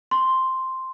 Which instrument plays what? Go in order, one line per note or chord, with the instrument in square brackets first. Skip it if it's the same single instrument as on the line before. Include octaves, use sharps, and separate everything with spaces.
[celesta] C6